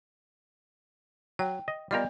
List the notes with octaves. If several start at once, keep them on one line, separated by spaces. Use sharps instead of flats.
F#3 G5
D#5
G3 B3 F4 A#4 D5 D#5